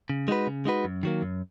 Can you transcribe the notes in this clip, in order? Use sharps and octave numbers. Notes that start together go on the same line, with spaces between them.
C#3
G#3 D#4 F#4 B4
C#3
G#3 D#4 F#4 B4
F#2
D#3 F#3 A#3
F#2